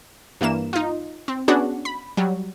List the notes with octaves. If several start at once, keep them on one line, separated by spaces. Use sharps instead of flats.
G2 E3 A#3 E7
D#4 F4
C4
B3 C#4 D4 F#4 G#4 F#5
B5
F#3 G3